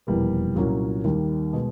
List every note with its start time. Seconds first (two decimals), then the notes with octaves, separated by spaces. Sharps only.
0.07 F1 E2 B2 G3 A#3
0.56 C2 A#2 F#3 A#3 C#4
1.04 D#2 D#3 G3 A#3
1.53 B2 G#3